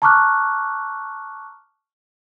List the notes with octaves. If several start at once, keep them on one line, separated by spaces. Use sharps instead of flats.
A5 A#5 C#6 D6 F6 F#6